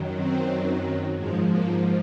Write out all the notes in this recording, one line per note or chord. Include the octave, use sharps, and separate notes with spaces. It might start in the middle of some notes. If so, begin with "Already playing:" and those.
Already playing: F#2 D#3 F#3
C4
G#2 F3 G#3
A#3